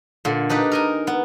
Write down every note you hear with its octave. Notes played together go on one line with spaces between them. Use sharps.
A#2 D3
D4 D#4 G4 B4
A#4 D#5 G#5
B3